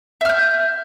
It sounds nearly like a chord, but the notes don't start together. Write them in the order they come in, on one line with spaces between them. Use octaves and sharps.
E5 F6 G6